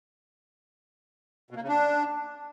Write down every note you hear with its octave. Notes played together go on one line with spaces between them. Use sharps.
B2
A#3
C#3
D4